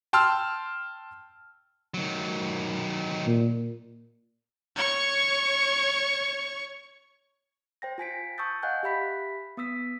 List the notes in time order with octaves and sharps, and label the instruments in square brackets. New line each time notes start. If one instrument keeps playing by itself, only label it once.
[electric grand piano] G5 A5 C6 E6 F6
[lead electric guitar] D#3 F#3
[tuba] A#2
[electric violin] C#5 C#6
[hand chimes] C5 G5 A#6
F4 G#5 B6 D7
A5 C#6 D#6 E6 G6 A6
D#5 F5 F#5 G#5 F#6 G6
G4 E5 B5 B6
B3 D#6 E6 B6